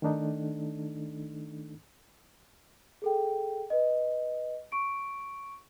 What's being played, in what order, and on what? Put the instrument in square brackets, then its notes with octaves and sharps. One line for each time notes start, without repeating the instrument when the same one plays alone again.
[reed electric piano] D#3 A3 D4 D#4 A4
[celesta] G#4 A4 G5
B4 D#5
C#6 D7